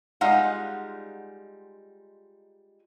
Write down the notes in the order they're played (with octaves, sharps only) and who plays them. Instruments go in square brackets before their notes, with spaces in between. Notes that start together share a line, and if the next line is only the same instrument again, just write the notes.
[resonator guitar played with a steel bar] G3 G#3 D#4 F4 F5 F#5